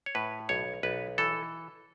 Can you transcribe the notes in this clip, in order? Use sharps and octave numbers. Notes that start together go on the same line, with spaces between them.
C#5
A2 B4
B1 C#5
B1 B4
E3 A4